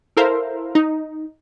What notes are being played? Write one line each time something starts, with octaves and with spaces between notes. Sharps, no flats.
E4 A4 A#4 C5 E5 F5
D#4